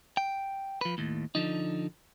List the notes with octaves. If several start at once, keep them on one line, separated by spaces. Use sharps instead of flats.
G5
F3 B4
D#2 A2
D3 F3 D#4